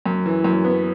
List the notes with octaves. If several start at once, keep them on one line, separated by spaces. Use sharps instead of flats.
F#2
E3
F#2
B3